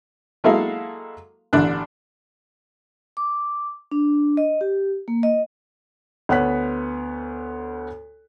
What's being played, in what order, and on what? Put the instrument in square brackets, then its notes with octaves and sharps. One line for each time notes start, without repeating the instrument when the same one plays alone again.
[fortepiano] F#3 G#3 A#3 E4 A4 F5
A1 D3 D4 D5 F#6
[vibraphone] D6
D4
D#5
G4
A#3
D#5
[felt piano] D2 B3 C#5 F#5 F#6 B6